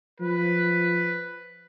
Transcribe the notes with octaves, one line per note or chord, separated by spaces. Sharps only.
F3 B4